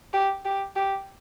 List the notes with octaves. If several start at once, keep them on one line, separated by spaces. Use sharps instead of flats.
G4
G4
G4